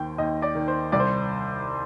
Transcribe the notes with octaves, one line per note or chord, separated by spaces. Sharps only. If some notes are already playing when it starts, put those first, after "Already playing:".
Already playing: D#2 D#3 C5 G5
D#2 D#5
D5
D#3
C5
C2 D5
C5